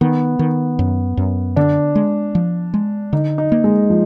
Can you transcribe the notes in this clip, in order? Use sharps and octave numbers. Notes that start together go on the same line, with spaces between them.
D#3 B3
D#3
F#2
F#2
D3 D4
G#3
F3
G#3
D3 D#4
D#4
A#3
G#3
F3